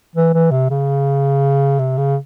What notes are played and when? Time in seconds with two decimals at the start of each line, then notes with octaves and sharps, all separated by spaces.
0.16 E3
0.34 E3
0.51 C3
0.70 C#3
1.79 C3
1.97 C#3